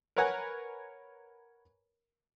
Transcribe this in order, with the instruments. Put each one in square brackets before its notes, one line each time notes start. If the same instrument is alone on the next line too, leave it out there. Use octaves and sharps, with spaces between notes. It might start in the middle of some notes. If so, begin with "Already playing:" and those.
[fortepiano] A#4 B4 C#5 F#5 G#5 A#5